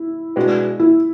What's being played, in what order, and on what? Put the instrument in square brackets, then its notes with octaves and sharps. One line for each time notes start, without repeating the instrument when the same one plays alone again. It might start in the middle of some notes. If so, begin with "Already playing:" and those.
Already playing: [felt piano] E4
[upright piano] B2 G#3 B3 D4 F#4
[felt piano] E4